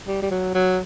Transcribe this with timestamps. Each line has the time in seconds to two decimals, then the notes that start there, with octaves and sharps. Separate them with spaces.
0.07 G3
0.22 G3
0.31 F#3
0.55 F#3